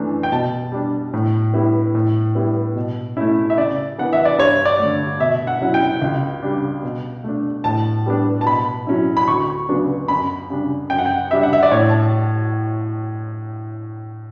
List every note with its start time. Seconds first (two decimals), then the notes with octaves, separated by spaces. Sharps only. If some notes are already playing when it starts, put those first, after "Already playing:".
Already playing: F#2 E3 A3 D4
0.23 G5
0.32 B2 A5
0.72 G3 D4
1.14 A2
1.53 G3 B3 E4
1.95 A2
2.35 G3 B3 E4
2.76 B2
3.17 A3 C#4 E4
3.50 E5
3.57 C#3 D5
3.99 E3 B3 F#5
4.13 E5
4.25 D5
4.38 G2 C#5
4.65 D5
4.79 D3 A3
5.20 B2 E5
5.47 F#5
5.62 F#3 C#4 E4
5.74 G5
6.02 C#2
6.43 C#3 G3 D4
6.83 B2
7.24 A3 D4
7.64 A2 A5
8.06 G3 B3 D4
8.41 A5
8.46 B2 B5
8.87 F#3 C#4 E4
9.17 B5
9.28 D2 C#6
9.69 C#3 F#3 B3 D4
10.08 F#2 B5
10.50 C#3 G3 D4
10.90 F#2 G5
10.98 F#5
11.06 G5
11.31 C#3 G3 D4 E5
11.43 F#5
11.53 E5
11.63 D5
11.71 A2 C#5
11.89 A5